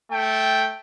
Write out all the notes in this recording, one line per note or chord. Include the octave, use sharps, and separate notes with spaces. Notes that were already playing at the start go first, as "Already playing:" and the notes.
A3 G5